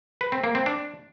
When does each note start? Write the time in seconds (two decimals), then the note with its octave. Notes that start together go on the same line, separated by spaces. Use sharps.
0.21 B4
0.32 C4
0.44 A#3
0.55 C4
0.66 D4